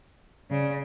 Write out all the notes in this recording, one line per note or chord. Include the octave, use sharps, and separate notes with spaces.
C#3 D5